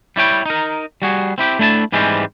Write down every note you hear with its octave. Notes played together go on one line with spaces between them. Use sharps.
G3 E4 C#5 G5
D#4 A#4
G3 F#4 G#4
C4 E4 G4
A3 D4 E4 G#5 A5
G#2 E3 G3 G#3 C4 C#4